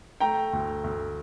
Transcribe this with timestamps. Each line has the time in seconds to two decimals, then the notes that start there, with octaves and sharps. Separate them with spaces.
0.20 A3 G5 A#5
0.53 D2
0.84 D2